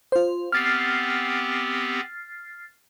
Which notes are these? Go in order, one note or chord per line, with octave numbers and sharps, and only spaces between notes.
F4 C5
B3 C4 G4 F6 A6 C7